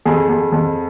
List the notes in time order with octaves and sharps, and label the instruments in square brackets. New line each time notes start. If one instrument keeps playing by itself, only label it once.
[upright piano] F2 G#4
F2
F2